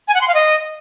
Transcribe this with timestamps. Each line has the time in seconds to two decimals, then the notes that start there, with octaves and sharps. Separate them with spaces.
0.08 G#5
0.15 F#5
0.21 C6
0.28 F5
0.34 D#5